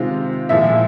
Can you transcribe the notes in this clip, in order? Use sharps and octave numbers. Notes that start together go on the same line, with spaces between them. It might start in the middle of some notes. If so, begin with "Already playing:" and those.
Already playing: C3 D#3 G#3 C4 F4
A#2 F3 G#3 E4 E5